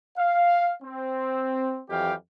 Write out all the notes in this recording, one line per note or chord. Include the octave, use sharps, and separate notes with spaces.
F5
C4
F2 E3 F#3 G4 F5 G5